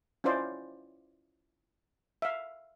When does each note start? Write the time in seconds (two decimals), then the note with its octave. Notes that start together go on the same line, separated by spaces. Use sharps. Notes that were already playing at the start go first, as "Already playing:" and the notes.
0.24 C#4 E4 F4 C5 D5 D#5
2.22 E5 F5